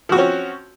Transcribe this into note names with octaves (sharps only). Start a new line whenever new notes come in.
F3 C4 C#4 F#4